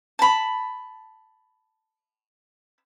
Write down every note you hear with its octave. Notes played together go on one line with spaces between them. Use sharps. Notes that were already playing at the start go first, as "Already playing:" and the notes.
A5 B5